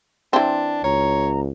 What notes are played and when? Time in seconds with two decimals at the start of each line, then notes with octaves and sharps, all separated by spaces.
0.33 E3 C4 D4
0.84 C#2 C#5 A#5